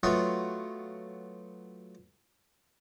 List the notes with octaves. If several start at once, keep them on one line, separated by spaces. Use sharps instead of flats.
F#3 A3 B3 F4